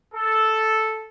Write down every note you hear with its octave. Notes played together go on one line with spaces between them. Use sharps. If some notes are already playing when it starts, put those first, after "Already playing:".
A4